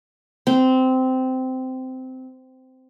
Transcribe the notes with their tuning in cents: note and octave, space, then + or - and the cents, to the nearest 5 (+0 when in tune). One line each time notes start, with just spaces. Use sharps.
C4 -15